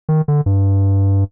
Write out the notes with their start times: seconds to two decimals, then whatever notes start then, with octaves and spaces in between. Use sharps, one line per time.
0.09 D#3
0.28 D3
0.46 G2